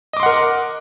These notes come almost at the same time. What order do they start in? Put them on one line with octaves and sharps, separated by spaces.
D#5 D6 C6 F#5 A#4